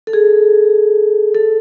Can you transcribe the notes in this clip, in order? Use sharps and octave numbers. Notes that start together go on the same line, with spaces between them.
A4
G#4
A4